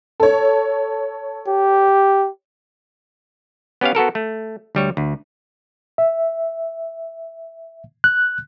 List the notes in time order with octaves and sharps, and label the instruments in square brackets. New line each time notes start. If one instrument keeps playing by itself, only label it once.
[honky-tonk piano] A4 C#5
[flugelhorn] G4
[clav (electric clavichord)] B3 C#4 G4 C#5 F5
B3 F#4 A4 A#4
A3
D2 G3 C#5
D2
[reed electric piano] E5
F#6